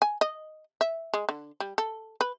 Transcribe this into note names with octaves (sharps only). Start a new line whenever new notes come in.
G#5
D#5
E5
G#3
D3
G3
A4
B4